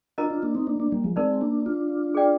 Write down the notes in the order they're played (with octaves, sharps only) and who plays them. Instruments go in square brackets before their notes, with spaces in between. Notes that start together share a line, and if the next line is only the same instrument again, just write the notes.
[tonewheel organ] D4 F4 [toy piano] A#4 D#5 A#5
[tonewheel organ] D4 F4
A#3 D4
C4 D#4
A#3 D4
A#3 D4
G3 A#3
F3 G#3
[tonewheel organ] G#3 C4 [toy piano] D#4 A#4 D5
[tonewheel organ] A#3 D4
D4 F4
[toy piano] G#4 D5 G5